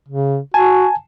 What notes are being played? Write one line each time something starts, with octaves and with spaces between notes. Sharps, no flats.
C#3
F#4 G#5 A5